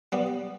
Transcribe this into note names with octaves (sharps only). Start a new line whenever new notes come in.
G3 B3